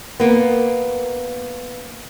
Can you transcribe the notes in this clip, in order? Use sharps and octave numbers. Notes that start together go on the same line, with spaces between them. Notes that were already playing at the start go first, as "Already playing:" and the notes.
A#3 B3